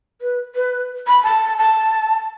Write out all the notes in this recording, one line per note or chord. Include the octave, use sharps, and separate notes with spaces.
B4
B4
B5
A5
A5